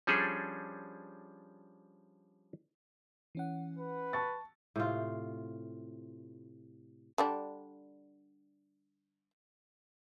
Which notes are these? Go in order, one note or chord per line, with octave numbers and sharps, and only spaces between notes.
F3 G3 C#4 D4 G#4 A4
E3 C#4 F#5
B4
A5 C#6 A6
A2 C3 F4
D3 G3 D4